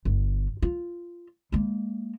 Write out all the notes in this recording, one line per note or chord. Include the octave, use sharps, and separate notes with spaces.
G1
F4
G#3 A#3